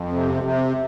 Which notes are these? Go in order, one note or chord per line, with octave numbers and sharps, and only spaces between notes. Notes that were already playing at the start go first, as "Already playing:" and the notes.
Already playing: F2
C3
C3